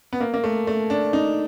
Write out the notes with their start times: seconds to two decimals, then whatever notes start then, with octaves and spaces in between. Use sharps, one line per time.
0.13 B3
0.20 A#3
0.34 A#3
0.44 A3
0.67 A3
0.90 D4
1.13 D#4